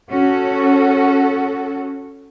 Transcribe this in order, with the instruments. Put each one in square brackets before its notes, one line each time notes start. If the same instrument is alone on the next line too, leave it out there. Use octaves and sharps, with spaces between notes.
[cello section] C#4 F#4 A4